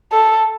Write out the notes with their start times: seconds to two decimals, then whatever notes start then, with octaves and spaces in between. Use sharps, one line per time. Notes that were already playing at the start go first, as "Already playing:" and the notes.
0.12 A4